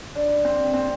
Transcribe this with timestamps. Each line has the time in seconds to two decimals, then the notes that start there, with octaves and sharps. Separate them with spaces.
0.16 D4
0.45 C4
0.74 C4